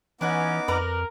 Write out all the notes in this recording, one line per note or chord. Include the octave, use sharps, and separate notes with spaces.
E3 B3 C#4 D#4 E4 F#5 G#5 D6
F2 A#4 B4 D5 A#5